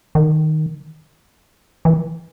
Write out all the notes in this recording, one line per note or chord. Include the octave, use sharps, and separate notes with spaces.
D#3
E3